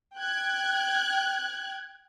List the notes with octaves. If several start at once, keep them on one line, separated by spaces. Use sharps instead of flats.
G5 F#6 G#6